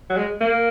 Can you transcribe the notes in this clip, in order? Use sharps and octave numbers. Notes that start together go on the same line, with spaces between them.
F#3
G#3
A#3